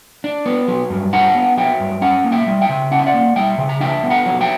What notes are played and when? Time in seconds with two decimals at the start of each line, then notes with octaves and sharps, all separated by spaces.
0.24 D4
0.46 B3
0.68 F#3
0.90 G2
1.13 D4 F#5 A#5
1.35 B3
1.58 F#3 E5 G5
1.80 G2
2.02 C#4 F#5 A#5
2.24 A#3
2.32 E5 G5
2.47 G3
2.61 E5 G5
2.69 C#3
2.91 C#4 F#5
2.99 E5
3.06 D5 F#5
3.14 A#3
3.36 G3 E5 G5
3.58 C#3
3.69 A#5
3.81 D4 E5 G5
4.03 B3
4.10 F#5 A#5
4.26 F#3
4.41 E5 G5